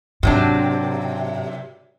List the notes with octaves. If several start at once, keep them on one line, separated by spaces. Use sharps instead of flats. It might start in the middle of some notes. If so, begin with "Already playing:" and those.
G#2 C3 F#3 D4